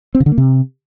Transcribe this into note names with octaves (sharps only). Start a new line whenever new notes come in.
C4
C#3
D3
A#3
C3